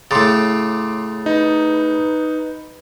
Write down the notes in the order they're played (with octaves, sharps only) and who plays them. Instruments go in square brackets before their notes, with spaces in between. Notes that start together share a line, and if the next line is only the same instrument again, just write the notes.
[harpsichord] A2 C#3 [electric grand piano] C6 D6 A6
[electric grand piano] D#4 [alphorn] B4